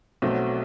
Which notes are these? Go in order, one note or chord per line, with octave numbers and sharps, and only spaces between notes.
B1 B2 F#3 A3 C4